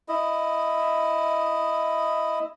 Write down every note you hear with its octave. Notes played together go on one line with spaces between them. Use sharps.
E4 D#5